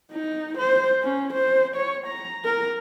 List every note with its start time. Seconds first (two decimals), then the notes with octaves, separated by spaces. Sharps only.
0.12 D#4
0.58 C5
1.03 C#4
1.34 C5
1.76 C#5
2.07 A#5
2.45 A#4